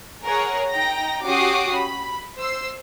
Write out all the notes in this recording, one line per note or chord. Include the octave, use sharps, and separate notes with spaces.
G#4 A#4 C#5 F#5
D#4 G5 A#5 A#6
C#4 F#4 G4 D6 D#6 C7
B5
C5 E6 C7